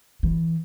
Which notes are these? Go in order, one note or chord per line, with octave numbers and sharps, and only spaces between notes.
E3